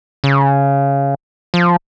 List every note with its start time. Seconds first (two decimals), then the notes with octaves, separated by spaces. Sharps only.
0.24 C#3
1.54 F3